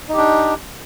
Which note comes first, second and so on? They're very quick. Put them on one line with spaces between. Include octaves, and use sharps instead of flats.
D#4 G4 D4